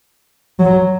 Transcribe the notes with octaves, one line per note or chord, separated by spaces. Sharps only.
F#3